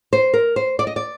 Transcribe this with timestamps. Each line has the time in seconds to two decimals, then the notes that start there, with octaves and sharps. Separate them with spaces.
0.13 C5
0.34 A#4
0.56 C5
0.79 D5
0.87 D#5
0.96 D5